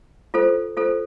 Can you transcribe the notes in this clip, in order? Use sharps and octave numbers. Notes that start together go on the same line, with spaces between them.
F4 A4 C5
F4 A4 C5